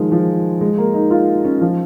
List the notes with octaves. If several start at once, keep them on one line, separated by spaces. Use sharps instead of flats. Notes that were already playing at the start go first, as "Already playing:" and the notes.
Already playing: D#3 F3 G#3
F3
G#3
A#3
D#4
F4
C#4
F3